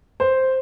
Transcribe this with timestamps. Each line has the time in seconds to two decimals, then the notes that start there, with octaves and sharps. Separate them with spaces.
0.20 C5